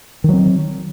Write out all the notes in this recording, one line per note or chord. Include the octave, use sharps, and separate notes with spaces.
D#3 F#3 C4